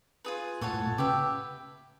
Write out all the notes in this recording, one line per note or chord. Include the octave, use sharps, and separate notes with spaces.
F4 G#4 B4
A#2 A4 C#5 F#5 A5
A2
A#2
C#3 G4 B4 E5